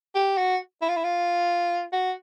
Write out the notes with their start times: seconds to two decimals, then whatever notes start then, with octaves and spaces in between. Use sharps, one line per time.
0.15 G4
0.37 F#4
0.82 E4
0.89 F4
0.96 E4
1.04 F4
1.92 F#4